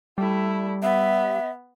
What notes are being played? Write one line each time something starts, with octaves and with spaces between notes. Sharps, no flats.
G3 A3 E4
B3 E5